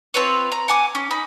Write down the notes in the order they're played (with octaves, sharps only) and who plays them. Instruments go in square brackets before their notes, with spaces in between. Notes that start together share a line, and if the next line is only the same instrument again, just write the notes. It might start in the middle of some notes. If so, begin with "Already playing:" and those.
[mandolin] C4 F4 B4 C#5
A#5
F#5 G#5 D6
C#4
D#4 B5